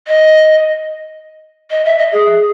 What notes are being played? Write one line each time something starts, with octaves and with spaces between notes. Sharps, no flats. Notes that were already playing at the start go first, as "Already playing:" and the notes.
D#5
D#5
E5
D#5
G#4